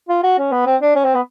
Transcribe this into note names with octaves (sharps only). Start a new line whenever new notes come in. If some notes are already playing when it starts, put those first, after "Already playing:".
F4
F#4
C#4
B3
C4
D4
C#4
C4
B3